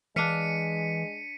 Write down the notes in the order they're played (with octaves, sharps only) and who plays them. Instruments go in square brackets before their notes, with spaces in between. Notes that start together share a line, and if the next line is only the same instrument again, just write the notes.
[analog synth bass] E3 [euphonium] G#3 [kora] D4 F5 [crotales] B6 C#7 D#7